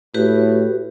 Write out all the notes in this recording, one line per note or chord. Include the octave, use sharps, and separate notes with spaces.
A2 F#4 G4 B4